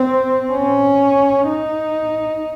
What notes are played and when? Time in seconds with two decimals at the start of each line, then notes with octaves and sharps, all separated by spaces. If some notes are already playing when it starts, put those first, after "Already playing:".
Already playing: C4
0.53 C#4
1.48 D#4